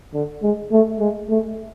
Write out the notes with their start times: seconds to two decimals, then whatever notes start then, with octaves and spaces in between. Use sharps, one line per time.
0.14 D3
0.43 G#3
0.72 A3
1.00 G#3
1.29 A3